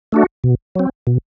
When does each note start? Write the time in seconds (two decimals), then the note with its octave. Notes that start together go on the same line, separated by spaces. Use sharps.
0.12 A3 D4 F#4
0.44 B2
0.75 F#3 C4
1.07 B2